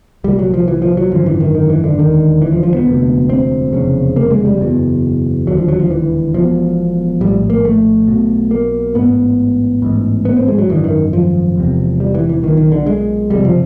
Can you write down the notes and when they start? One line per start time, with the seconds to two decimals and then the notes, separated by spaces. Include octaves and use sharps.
0.24 C2 A#2 G3
0.39 F#3
0.54 F3
0.68 E3
0.82 F3
0.97 F#3
1.11 G#1 F#2 D3 F3
1.26 E3
1.40 D#3
1.55 D#3
1.70 E3
1.84 D3
1.98 E1 D#2 D3 D#3
2.42 E3
2.53 F3
2.63 F3
2.74 B3
2.85 E1 D2 C3
3.30 C4
3.73 F1 E2 C#3
4.16 A#3
4.31 G#3
4.45 G3
4.60 F#1 E2 B2
5.47 E1 D#2 D3 F#3
5.57 F3
5.69 F#3
5.79 F3
5.91 E3
6.34 E1 E2 B2 F3
7.21 A#1 A2 G3
7.50 A#3
7.65 A3
8.08 B1 B2
8.51 A#3
8.95 A1 G#2 B3
9.82 A1 G#2
10.25 B3
10.37 C4
10.48 G#3
10.58 F#3
10.70 G#1 F#2 D3 E3
10.84 D#3
11.13 F3
11.56 E1 E2 C3
12.00 G3
12.15 E3
12.29 E3
12.43 B1 A#2 D#3
12.57 D#3
12.72 D3
12.87 G#3
13.30 F#1 F2 C3 G3
13.45 F3